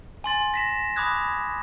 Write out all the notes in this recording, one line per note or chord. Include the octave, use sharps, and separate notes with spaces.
G#5 C6 A6
A#6 B6 E7
B5 D6 D#6 F#6 G#6